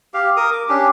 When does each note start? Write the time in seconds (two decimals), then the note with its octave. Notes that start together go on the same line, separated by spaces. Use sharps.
0.14 G4 F5
0.37 A#4 D#6
0.52 D6
0.69 C#4 D4 G4